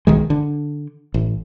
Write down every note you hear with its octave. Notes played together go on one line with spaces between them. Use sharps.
B1 D#3 G#3
D3
A1